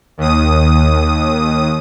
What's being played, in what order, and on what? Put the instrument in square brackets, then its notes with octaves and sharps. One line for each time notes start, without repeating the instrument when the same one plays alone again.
[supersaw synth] D#2 D#6